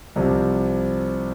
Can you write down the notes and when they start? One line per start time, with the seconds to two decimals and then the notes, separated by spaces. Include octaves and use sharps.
0.16 C2 C3 F3 C4